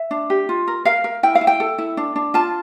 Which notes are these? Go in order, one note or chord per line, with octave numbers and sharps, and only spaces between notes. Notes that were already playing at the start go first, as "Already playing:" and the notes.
Already playing: E5
D4
G4
F4
A#4
A#4 F5
A#4
E4 G5
F5
E4
G5
A4
E4
D4
D4
F4 A5